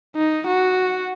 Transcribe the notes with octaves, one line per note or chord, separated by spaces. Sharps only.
D#4
F#4